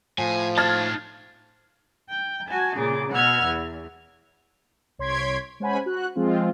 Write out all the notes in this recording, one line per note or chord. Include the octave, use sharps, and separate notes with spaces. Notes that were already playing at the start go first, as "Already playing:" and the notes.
A2 F3 G#5
D#4 A5 F6 G#6 A6
G5
F#4 G#5 A5
A#2 C#3 G#4 D6
B2 B4 F#5 E6 F6 G#6
E2
C2 C#5 C6 G#6 B6 D7
G#3 C#4 C5 F#5 G#5 B5
F#4 F#6
F3 G#3 C4 F4